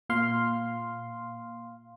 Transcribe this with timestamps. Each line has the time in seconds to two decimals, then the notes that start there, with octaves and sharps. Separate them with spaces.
0.09 A#2 F5 C6